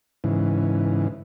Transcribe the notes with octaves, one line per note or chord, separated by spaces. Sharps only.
G#2 C#3 E3